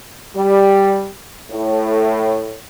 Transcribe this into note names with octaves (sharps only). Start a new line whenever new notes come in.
G3
A2